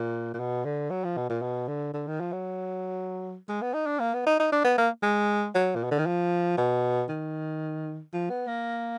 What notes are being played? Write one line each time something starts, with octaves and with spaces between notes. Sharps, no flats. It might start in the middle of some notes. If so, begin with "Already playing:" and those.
Already playing: A#2
A#2
B2
D3
F#3
F3
B2
A#2
B2
D3
D3
D#3
F3
F#3
G#3
B3
D#4
D4
A#3
B3
D#4
D#4
D4
B3
A#3
G#3
F#3
A#2
B2
D3
D#3
F3
B2
D#3
F3
B3
A#3